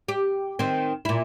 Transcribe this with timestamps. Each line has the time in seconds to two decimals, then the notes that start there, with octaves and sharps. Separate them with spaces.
0.08 G4
0.59 D#3 C4
1.05 A#2 E4